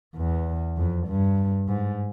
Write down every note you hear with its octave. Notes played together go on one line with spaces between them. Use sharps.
E2
F2
G2
G#2